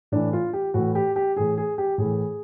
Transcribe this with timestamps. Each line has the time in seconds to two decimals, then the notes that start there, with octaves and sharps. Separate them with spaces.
0.12 A2 E3 D4
0.33 F4
0.53 G4
0.74 A2 E3 F#4
0.95 G4
1.16 G4
1.37 A2 E3 G#4
1.58 G#4
1.78 G4
1.98 A2 E3 G#4